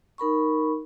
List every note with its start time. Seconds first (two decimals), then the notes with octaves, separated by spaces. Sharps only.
0.18 D#4 A#4 B5 C#6